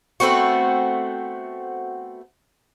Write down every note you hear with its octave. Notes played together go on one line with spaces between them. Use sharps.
A3 B3 C4 F#4